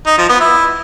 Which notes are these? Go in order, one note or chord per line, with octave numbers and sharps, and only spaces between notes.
D#4
F3
B3
E4